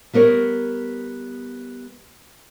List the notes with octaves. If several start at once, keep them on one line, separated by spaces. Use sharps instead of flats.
G3 B3 A#4 C#5